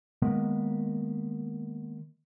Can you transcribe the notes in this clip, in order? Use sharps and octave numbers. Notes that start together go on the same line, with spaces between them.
D#3 G#3 A#3 B3